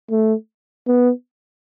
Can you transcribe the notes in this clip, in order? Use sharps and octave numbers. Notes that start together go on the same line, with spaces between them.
A3
B3